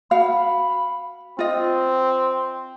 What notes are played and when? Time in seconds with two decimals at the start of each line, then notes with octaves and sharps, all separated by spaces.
0.11 F#4 F5 B5
1.39 C4 F4 D#5